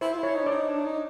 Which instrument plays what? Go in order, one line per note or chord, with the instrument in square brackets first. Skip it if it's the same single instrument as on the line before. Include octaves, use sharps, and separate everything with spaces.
[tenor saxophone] E4 [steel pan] C5
[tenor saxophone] F4
E4
[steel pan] C#5
[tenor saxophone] D#4
D4
[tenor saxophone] D#4 [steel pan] D5
[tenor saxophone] D4
D#4